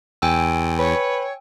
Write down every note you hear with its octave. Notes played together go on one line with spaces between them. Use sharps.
E2 G5 G#5 E6
B4 C#5